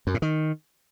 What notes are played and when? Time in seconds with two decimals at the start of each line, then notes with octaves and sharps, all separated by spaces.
0.07 F#2
0.14 A2
0.22 D#3